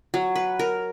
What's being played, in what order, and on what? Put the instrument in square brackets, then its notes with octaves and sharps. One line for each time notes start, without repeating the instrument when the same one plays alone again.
[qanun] F#3
B4
A#4